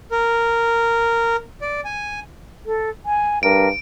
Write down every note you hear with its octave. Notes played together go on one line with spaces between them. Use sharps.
A#4
D5
G#5
A4
G#5
G2 A#4 D7